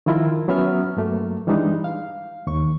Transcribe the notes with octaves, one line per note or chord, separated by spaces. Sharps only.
D#3 F3 E4 F4 A#4
F#3 B3 C#4 E5 F6
G2 F#3 A3 A#3
E3 G3 G#3 D4 D#4
F5
D#2 C#6